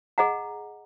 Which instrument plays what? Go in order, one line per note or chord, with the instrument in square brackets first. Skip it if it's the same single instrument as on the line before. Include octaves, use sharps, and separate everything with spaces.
[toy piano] G#4 D#5 F#5 A#5